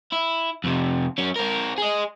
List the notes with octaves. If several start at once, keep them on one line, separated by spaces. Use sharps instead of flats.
E4
F2 C3
F#3 C#4
C4 A#4
G#4 D#5